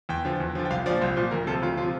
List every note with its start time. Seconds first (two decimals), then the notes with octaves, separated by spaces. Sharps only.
0.09 E2 G5
0.25 D3 F3
0.40 E2
0.55 D3 F3
0.65 G5
0.70 C2 F5
0.86 F3 D5
0.90 A#2
1.01 C2 C5
1.16 A#2 F3
1.31 D2 A#4
1.47 C3 F3 A4
1.62 D2 F4
1.77 C3 F3 F4